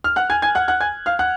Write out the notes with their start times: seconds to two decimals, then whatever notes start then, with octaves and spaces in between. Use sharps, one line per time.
0.04 F6
0.16 F#5 F#6
0.30 G#5 G#6
0.42 G#5 G#6
0.55 F#5 F#6
0.68 F#5 F#6
0.81 G#5 G#6
1.06 F5 F6
1.19 F#5 F#6